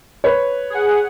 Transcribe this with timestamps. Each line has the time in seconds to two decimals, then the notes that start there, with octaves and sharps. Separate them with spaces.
0.24 B4 C#5
0.70 G#4 F#5